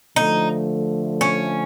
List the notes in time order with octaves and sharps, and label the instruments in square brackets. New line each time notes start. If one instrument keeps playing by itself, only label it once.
[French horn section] D3 F3 A3 [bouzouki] D#4
[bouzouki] C#4